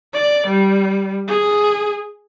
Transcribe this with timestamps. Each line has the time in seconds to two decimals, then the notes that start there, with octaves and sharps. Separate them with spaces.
0.14 D5
0.47 G3
1.28 G#4